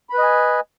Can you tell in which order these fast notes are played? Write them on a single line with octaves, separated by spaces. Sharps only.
B5 B4 D#5 G#5